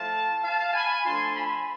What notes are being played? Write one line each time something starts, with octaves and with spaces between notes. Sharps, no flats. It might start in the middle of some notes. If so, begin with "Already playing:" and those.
Already playing: F3 A3 E4 F5 A5
F5 A5
G#5 B5
F3 A3 D4 F4 A5 C6
G#5 B5